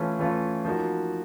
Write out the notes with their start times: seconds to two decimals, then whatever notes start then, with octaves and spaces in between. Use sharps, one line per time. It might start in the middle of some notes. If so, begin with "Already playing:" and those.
Already playing: E3 A3 C#4 F4
0.19 E3 A3 C#4 F4
0.65 F3 A#3 D#4 F#4